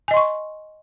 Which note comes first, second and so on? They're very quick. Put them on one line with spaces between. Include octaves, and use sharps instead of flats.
G#5 D#5 C6 C#6